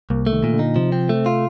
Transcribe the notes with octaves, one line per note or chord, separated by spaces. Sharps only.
C2 A#3
A3
D#3
A#2
D3
D#4
C3 F3
C4
A3
F4